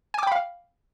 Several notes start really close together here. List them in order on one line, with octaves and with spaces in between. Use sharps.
G#5 D6 G5 B5 F5